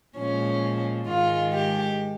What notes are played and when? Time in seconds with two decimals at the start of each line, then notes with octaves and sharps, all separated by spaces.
0.16 A#2 F3 G#3 C#4
1.07 G#2 D#3 G#3 F4
1.53 G4